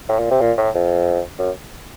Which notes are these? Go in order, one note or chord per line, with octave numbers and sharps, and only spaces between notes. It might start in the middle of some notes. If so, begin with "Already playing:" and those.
A2
A#2
C3
A#2
A2
F2
F#2